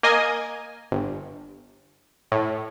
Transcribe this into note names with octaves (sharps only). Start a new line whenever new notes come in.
A#3 D#5 G#5
G1
A2